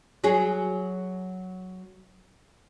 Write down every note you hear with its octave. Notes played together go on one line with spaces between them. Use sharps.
F#3 G#4